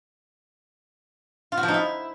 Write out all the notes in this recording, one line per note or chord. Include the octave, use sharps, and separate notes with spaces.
F4
F#4
F3
D#4
E4